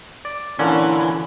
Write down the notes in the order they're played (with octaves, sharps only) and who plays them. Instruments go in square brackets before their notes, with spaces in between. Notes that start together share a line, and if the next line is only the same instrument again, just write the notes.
[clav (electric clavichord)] D5
[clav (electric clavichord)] A#2 D3 C#4 [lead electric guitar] E3